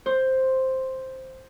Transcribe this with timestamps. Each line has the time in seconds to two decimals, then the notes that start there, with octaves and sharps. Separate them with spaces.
0.06 C5